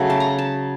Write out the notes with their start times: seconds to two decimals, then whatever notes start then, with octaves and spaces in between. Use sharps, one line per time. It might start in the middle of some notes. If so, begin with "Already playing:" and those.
Already playing: C#3 F#3 A3
0.10 A5
0.20 A#5
0.38 A5